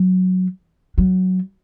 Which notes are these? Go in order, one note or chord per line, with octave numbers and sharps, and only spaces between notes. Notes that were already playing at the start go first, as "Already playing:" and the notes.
Already playing: F#3
F#3